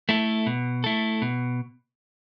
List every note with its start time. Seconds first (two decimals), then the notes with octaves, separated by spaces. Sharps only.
0.09 A3 E4 A4
0.46 B2
0.84 A3 E4 A4
1.22 B2